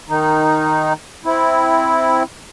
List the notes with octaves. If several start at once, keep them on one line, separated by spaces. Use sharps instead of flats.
D#3 D#4
C4 E4